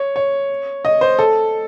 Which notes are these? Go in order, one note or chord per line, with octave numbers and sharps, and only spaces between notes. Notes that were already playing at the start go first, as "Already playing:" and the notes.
Already playing: C#5
C#5
D#5
C5
A4